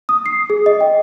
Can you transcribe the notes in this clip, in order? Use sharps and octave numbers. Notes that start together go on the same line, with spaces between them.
D#6
C7
G#4
D#5
G5